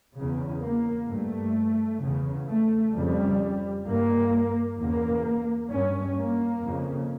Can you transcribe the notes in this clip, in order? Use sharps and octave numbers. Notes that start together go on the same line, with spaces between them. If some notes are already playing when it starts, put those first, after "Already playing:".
E2 C#3
A#3
G2 A3
E2 C#3
A3
F2 C#3 G3
G2 A#3
E2 C#3 A#3
G2 C#4
A#3
F2 C#3